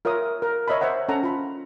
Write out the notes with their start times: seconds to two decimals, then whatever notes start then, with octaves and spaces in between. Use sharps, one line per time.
0.05 F4 A#4 C#5 E5 D#6
0.42 A#4
0.68 C#5 D#5 E5 A#5 B5
0.81 C5 C#5 E5 F#5 A#5
1.08 C#4 A4 F#5 A#5
1.24 F4 B5